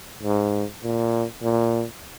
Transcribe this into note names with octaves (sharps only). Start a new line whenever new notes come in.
G#2
A#2
A#2